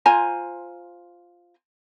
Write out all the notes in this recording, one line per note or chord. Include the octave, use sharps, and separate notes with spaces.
F4 C5 G#5 A#5